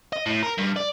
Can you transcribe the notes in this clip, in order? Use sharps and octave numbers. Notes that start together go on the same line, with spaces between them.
D#5
A2
A#4
G2
D5